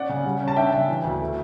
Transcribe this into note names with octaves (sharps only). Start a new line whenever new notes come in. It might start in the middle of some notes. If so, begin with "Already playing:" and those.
Already playing: C#4 D5 F#5
C#3
G3
C#4
A5
D4 E5 G5
C#3
E3
D2
A3